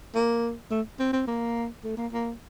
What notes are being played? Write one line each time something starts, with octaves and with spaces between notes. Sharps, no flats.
A#3
A3
C4
C4
A#3
A3
A#3
A#3